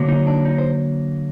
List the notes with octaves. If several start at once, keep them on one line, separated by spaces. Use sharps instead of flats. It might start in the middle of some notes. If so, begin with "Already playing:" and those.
Already playing: D3 F#3 A#3
D#4
D4
D#4
C5